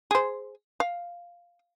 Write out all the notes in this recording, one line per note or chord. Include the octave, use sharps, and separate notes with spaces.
G#4 C5
F5